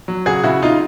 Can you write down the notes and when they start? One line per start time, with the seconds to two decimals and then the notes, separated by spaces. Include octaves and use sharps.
0.08 F#3
0.26 C#3 F#4 G#4
0.43 C#3 E4 F#4
0.62 C#3 D#4 F4